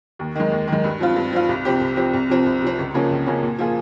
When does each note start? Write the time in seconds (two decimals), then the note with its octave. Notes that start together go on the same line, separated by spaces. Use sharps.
0.19 D#2
0.35 D#3 G#3
0.52 D#2
0.67 D#3
0.72 G#3
0.84 G2
1.00 F3 C4 F4
1.16 G2
1.33 F3 C4 F4
1.49 C2
1.65 C3 F3 C4 G4
1.81 C2
1.97 C3 F3 C4 G4
2.14 C2
2.29 C3 F3 C4
2.46 C2
2.62 C3 F3 C4
2.79 C#2
2.94 C#3 F3 A#3 C#4
3.11 C#2
3.26 C#3 F3 A#3 C#4
3.43 A#2
3.58 F3 A#3 F4 G#4